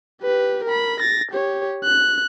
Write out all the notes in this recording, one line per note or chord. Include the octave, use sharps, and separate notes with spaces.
G4 B4
A#4 B5
A6 A#6
G4 C#5
F#6